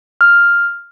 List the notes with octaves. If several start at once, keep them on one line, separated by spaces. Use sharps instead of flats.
F6